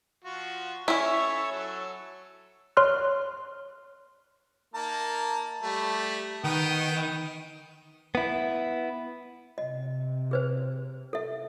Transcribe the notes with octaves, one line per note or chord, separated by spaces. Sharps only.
F3 F4 F#4
C#4 E4 A4 C#5 E5
F#3 A4
C#5 C6 F6 F#6
A#3 D#4 A5
G3 A3
D#3 B3 G5 D#6
B3 E4
C3 D#5
G#4 B4 C5
A4 E5